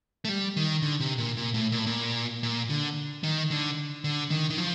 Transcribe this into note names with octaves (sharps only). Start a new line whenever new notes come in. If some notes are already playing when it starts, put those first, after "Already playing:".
A3
G3
D#3
D3
C3
A#2
A#2
A2
A#2
A2
A#2
A#2
D3
D#3
D3
D3
D#3
D#3
F3